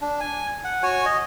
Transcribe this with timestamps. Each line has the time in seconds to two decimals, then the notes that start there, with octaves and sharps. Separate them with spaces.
0.02 D4
0.20 G#5
0.64 F#5
0.83 F#4 C#5 G#5
1.05 D#5